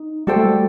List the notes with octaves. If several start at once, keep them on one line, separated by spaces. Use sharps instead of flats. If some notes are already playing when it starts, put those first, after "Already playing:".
Already playing: D#4
G3 F#4 A4 C5 G5
A3
G3